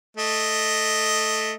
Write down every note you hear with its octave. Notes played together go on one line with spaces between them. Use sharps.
A3 D#5